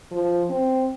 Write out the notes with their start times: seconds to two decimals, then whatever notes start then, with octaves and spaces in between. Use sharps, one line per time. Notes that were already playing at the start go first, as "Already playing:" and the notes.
0.12 F3
0.50 C4